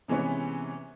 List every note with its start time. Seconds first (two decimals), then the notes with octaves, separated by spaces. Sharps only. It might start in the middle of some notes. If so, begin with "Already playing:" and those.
0.08 C3 E3 G#3 B3 C#4